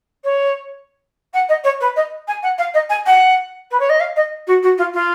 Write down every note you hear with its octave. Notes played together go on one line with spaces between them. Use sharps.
C#5
F#5
D#5
C#5
B4
D#5
G#5
F#5
F5
D#5
G#5
F#5
B4
C#5
D#5
F5
D#5
F#4
F#4
F4
F4